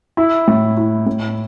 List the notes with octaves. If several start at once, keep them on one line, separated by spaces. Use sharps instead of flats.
E4
A2
E4
A2